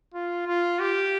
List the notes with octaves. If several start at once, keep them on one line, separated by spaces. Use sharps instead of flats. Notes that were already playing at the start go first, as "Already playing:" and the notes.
F4
F4
G4